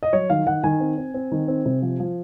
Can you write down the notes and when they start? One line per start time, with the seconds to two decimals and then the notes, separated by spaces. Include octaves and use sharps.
0.03 D#5
0.13 F#3 C#5
0.30 D#3 F5
0.46 D#3 F#5
0.64 D#3 G#5
0.80 C4
0.98 C4
1.14 C4
1.31 D#3
1.48 C4
1.65 C3
1.82 F3
2.00 F3